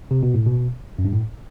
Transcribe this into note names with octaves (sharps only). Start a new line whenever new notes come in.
C3
B2
A2
B2
F#2
G2
A2